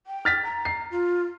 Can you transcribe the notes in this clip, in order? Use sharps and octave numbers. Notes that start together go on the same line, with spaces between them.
G5
F6 A6 B6
A#5
C7
F4